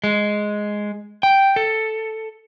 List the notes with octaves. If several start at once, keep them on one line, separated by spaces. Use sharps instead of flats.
G#3
G5
A4